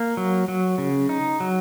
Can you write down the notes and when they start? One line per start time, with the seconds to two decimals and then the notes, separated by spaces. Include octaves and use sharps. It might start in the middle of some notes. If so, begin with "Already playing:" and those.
Already playing: A#3
0.17 F#3
0.48 F#3
0.78 C#3
1.09 D#4
1.40 F#3